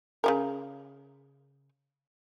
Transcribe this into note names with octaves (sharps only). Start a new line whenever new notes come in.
C#3 G#3 A#4